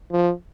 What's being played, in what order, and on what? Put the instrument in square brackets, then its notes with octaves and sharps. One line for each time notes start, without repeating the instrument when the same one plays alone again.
[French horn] F3